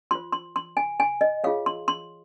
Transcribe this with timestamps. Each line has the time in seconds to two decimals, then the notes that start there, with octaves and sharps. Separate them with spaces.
0.11 F4 C5 C6
0.32 C6
0.56 C6
0.77 G#5
1.00 G#5
1.21 D#5
1.44 F4 G#4 C#5 F5
1.66 C6
1.88 C6